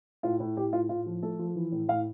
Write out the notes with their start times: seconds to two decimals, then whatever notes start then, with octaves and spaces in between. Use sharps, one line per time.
0.23 A2 F4
0.40 A2
0.57 A2 G4
0.73 A2 F4
0.89 A2 F4
1.06 F3
1.23 A3 A4
1.39 F3
1.56 E3
1.72 A2
1.88 A2 F5